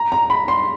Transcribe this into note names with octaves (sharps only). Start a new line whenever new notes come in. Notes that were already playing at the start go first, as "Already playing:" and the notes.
Already playing: A#5
A#5
B5
C6